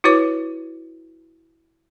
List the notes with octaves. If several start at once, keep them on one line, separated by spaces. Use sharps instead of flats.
E4 F#4 B4 C#5 D6